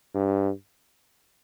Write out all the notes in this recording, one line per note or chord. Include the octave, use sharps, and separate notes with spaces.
G2